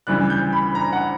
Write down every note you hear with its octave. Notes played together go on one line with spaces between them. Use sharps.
D2 C#3 E3 G3 F#6
G6
B5
A#5
F#5